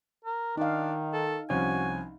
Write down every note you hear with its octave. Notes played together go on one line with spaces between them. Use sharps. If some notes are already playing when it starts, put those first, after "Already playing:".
A#4
D#3 D4 D#4 F5
A4
C2 F3 C#4 F#4 G#5